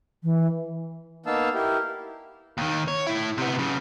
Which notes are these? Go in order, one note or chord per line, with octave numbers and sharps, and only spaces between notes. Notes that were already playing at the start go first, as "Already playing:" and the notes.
E3
A#3 B3 D#4 F5 A5 E6
E4 G4 A#4
D#2 D#3
C#5
A2 E4
C3 B3
F#2 C#3